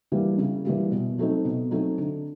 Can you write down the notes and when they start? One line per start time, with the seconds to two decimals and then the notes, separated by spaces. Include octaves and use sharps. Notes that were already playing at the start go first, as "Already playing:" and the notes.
0.12 E3 G3 A#3
0.38 C#3
0.65 E3 G3 A#3
0.91 B2
1.18 F#3 A3 C4 D#4
1.44 B2
1.71 F#3 A3 C4 D#4
1.98 D3